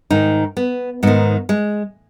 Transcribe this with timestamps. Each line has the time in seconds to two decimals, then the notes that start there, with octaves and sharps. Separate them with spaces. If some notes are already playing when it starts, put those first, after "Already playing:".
0.10 G#2 D#3 D#4
0.57 B3
1.03 G#2 D#3 B3
1.49 G#3